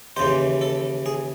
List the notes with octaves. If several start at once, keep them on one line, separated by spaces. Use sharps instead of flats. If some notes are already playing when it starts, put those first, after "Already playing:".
D#2 C#3 E3 C5
A4
G#4